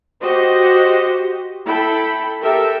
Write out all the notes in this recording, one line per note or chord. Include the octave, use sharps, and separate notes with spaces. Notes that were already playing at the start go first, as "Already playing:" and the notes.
F#4 G4 C5 D#5
E4 A4 G5 B5
G4 A4 A#4 E5 G5